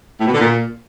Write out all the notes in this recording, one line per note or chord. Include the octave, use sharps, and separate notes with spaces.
A2
B2
D3
A#2